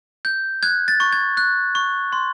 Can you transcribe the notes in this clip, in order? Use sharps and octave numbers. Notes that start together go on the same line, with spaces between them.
G6
F#6 G#6
A6
C#6
G#6
F#6
C#6
C6